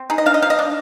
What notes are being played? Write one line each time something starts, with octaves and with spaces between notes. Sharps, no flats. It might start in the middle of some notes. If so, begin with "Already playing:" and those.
Already playing: C4
D#4 G#4
D#5
D4 F5
D#5
F3 F5
D#5
D4